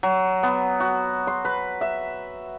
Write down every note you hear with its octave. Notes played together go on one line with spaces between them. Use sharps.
F#3
B3
F#4
C6
B4
E5